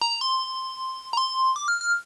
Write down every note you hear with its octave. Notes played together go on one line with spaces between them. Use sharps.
A#5
C6
A#5
C6
D6
F6
F6